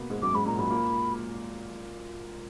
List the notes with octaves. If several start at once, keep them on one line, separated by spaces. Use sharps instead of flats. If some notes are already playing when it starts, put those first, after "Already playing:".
Already playing: B2 A#3 B3
G#2 G#3
F#2 F#3 D6
G#2 G#3 B5
A#2 A#3 A#5
F#2 F#3 B5
A#2 A#3